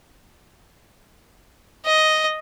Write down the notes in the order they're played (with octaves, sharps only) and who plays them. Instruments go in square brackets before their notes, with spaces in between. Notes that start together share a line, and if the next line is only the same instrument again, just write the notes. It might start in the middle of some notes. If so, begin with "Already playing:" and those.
[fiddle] D#5